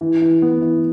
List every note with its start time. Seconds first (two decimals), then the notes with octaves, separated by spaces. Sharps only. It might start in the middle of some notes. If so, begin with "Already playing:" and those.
0.01 E3
0.22 E3
0.42 B3
0.62 E3